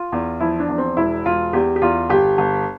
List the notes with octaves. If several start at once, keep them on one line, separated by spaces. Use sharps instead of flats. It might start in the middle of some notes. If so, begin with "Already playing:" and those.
Already playing: F4
E2
F3 E4
D4
E2
C4
E1 E4
E1 F4
E2 G4
G4
E2 F4
G1 G4
G1